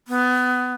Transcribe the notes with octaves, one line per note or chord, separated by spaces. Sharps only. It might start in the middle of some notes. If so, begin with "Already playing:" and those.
B3